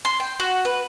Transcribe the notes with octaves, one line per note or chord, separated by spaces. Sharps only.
C6
G5
F#4
B4